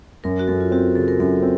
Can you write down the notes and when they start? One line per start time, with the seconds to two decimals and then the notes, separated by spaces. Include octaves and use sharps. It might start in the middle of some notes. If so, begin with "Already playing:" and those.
0.24 F#2 A#4
0.39 F#4
0.48 F#2 A4
0.60 F4
0.71 C4 F#4
0.95 C#3 A4
1.08 A#4
1.20 F#2 A4
1.42 C4